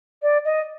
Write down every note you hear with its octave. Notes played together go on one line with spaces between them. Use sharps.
D5
D#5